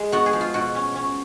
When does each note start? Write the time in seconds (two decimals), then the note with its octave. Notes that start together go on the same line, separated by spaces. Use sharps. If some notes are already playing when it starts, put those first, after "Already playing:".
Already playing: G#3
0.12 B3 F#4
0.26 G#4
0.33 F3
0.41 F4
0.54 B2 F#4
0.75 C#4
0.96 C#4